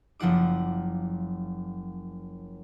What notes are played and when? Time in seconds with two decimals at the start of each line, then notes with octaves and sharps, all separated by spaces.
0.19 F#1 F3 F4 F#5 D6